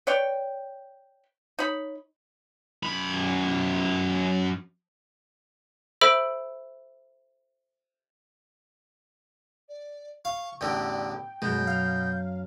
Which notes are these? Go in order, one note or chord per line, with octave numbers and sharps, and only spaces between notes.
B4 C#5 D5 G5
D#4 C#5 B5
F#2 B5
A4 C5 E5 B5 E6 D7
D5
F5 C#6
A1 E2 D3 D5 G5
F#2 B2 G#3 A3 G6
F5